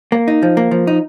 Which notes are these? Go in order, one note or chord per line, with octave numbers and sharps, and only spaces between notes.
A#3
D#4
F3
A#3
F3
D#4